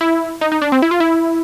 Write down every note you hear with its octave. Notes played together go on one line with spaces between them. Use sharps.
E4
D#4
D#4
D4
C4
E4
F4
E4